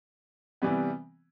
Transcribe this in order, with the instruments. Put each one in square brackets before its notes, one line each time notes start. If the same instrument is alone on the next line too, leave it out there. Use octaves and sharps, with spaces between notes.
[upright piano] C3 E3 G3 B3